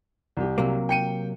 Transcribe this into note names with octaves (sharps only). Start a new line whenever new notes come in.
C2 G4
C3 F#3 A#3
G5 C#7 D#7